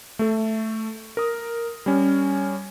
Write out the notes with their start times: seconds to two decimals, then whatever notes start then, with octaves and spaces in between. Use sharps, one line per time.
0.19 A3 A4
1.17 A#4 D#6
1.86 G3 C#4